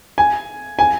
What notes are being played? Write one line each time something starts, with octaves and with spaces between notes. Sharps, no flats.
G#5
G#5